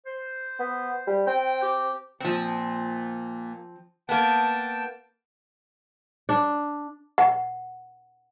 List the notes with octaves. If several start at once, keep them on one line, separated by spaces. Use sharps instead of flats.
C5
B3
G3
C4 G5
G4
A#2 F3 C4
A#3 B3 G5 A5
D4
F#5